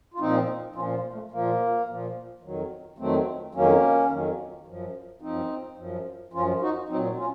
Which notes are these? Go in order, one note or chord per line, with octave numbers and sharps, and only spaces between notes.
F4
A#2 F3 C4 D#4
A#2 F3 C#4 F4
A#3
A3
A#2 F3 A#3
A#2 F3
F2 D#3 F#3
F2 D#3 F#3 A3 C4
F2 D#3 F#3 A#3 C#4
F2 D#3 F#3
F#2 F3
F#2 F3 C4 D#4
F#2 F3
F#2 F3 C#4 F4
D#4 F#4
A#2 F#3 C4 D#4
C#4 F4